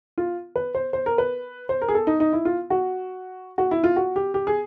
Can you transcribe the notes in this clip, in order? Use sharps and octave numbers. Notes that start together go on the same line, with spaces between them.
F4
B4
C5
C5
A#4
B4
C5
A#4
G#4
A4
D#4
D#4
E4
F4
F#4
F#4
E4
F4
F#4
G4
G4
G#4